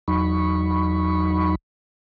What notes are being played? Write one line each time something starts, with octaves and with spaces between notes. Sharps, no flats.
E2 F#3 D#4 B5 C#6